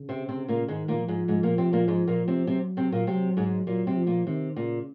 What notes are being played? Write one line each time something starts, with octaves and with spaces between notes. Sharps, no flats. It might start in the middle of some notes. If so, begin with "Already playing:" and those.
Already playing: C#3
C3 C4
C3 C4
A#2 A#3
G#2 D#3 G#3
A#2 A#3
F3
G#2 G#3
G#2 G#3
A#2 A#3
C3 C4
A#2 A#3
G#2 G#3
A#2 A#3
C3 C4
C3 F#3 C4
C3 C4
A#2 A#3
C3 F#3 C4
G#2 G#3
A#2 F#3 A#3
C3 C4
F3
A#2 A#3
C3 D#3
A#2 C#3